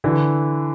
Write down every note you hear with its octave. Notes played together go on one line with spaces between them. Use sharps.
D3 E3